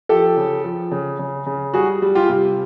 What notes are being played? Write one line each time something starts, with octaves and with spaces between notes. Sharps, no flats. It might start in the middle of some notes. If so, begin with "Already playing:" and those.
F3 G4 A4
C#3
F3
C#3
C#3
C#3
G3 F#4 G#4
G3
F4 G4
C3